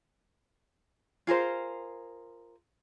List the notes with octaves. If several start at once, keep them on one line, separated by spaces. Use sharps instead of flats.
F4 G#4 A#4 C5